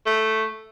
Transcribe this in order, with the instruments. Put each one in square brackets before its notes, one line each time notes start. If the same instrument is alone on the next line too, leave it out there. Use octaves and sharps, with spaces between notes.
[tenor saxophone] A3